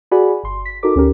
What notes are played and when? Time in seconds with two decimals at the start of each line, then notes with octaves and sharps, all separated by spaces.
0.11 F#4 G#4 D5 F#5 G#5 B5
0.43 G1 C6
0.65 B6
0.83 D#4 F#4 A4 A#4 D6
0.96 D2 C#4 G4 A#4